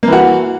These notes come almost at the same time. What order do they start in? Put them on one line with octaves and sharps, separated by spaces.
A#3 E3 F#4